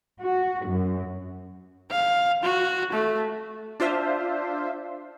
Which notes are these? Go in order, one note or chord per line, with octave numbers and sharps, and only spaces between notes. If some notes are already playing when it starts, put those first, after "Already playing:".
F#4
F#2
F5
F#4
A3
D4 F4 C5 E5 F5